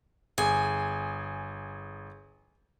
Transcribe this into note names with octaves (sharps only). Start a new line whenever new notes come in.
G1 G#4 G#5